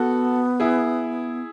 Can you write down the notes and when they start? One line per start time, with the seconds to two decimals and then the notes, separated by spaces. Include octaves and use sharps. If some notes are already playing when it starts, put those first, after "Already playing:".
Already playing: B3 F#4 A4
0.60 E4 G#4